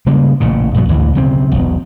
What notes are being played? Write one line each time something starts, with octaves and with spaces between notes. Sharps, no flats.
C#3 G3 G#3 A#3
A1 A#2 C#3
A#1 G2 B2 F#3
A1 D2 G2 E3
B1 C#3 C4
E1 B1